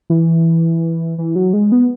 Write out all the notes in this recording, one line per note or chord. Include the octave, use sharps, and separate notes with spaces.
E3
E3
F#3
G#3
B3